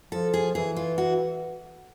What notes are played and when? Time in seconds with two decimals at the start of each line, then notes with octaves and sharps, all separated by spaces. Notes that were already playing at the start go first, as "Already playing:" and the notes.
0.11 F3 A4
0.34 G#4
0.55 E3 G#4
0.76 F4
0.98 F#4